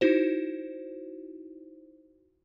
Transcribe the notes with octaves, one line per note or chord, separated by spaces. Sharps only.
D#4 E4 F#4 C5